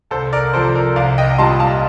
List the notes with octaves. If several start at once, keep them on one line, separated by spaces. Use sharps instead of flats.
C2 A4 C5
A#4 D5
C3 F3 A4 C5
A#4 D5
C2 D5 F5
D#5 G5
A#2 G3 A5 C6
F5 A5